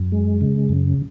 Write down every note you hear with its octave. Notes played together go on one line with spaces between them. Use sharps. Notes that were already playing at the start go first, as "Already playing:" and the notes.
Already playing: F#2
G#3
C#3
F#2